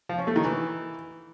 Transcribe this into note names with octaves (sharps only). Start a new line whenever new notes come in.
F3
C#4
A3
D#3
E3